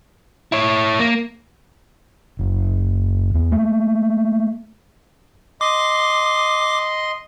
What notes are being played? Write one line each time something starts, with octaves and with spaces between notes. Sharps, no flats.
E4 C#5
A#3
F#1
E2
A3 A#3
D#5 C6 D6